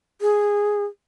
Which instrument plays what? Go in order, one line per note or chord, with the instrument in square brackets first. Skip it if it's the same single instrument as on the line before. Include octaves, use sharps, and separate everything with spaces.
[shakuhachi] G#4